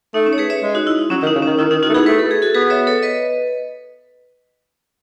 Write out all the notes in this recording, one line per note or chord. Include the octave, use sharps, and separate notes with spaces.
A3 D#4
C#4
C#5
G#4 B4
C#5 E5
G#3
D#4 F#4
E4
E4
F#3 C#4
D#3
D#4
C#3
D#3 C#4
D#3 E4
D#3 D#4
D#3 D#4 F#4
A3
B3 E4 G#4
A3 B4
A4
G#4
F#4 A4
B3 G#4 B4
C#5 E5
A4 C#5
B4 D#5